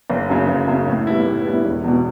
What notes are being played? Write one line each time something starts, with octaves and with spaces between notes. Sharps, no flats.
F#1
F#2 C#3
F#1
F#2 C#3
A2
G3 B3 E4
A2
G3 B3 E4
E1
E2 B2